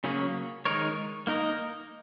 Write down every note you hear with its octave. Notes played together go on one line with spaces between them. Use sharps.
C#3 F#3 A#3 C#4 G#4
D#3 G#3 D#4 A#4 C#5
A#3 D#4 A#4 D#5